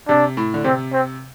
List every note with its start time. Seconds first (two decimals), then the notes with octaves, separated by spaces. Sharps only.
0.08 C3 D4
0.37 A2
0.54 D3
0.64 C3 C4
0.93 C4